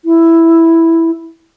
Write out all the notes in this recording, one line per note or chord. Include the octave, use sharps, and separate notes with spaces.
E4